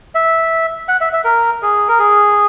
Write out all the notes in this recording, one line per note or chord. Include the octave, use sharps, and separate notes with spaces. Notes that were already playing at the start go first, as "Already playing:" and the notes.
E5
F#5
E5
E5
A#4
G#4
A#4
G#4